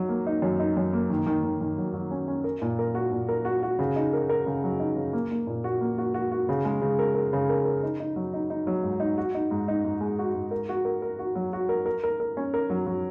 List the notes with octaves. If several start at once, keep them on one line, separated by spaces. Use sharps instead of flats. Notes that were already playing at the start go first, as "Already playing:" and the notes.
Already playing: F#3 D#4
A#3
D#4
F#2
D#4
F#2
A#3
D#3
D#3
D#3
D#3
F#3
F#3
C#4
C#4
A#4
A#2
A#4
F#4
A#2
A#4
F#4
F#4
C#3
D#4
A#4
A#4
C#3
F#3
D#4
C#3
A#3
A#3
A#2
F#4
A#3
F#4
F#4
F#4
C#3
G#3
C#3
A#4
A#4
C#3
A#4
A#4
D#4
D#4
F#3
D#4
D#4
F#3
G#2
D#4
F#4
D#4
G#2
D#4
G#2
G#3
F#4
G#2
A#4
F#4
A#4
A#4
F#4
F#3
F#4
A#4
A#4
A#4
A#4
C#4
A#4
F#3
F#3